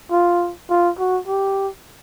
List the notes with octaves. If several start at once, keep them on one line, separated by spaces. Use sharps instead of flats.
F4
F4
F#4
G4